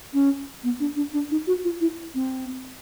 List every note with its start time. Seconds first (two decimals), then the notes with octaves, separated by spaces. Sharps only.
0.13 C#4
0.63 B3
0.80 D4
0.96 D4
1.13 D4
1.31 D#4
1.47 F#4
1.64 F4
1.81 E4
2.15 C4